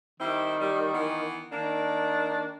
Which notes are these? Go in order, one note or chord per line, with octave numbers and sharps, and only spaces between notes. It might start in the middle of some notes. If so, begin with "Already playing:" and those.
D#3 G3 C4 E4
G3
E3 B3
D#3 A#3 D4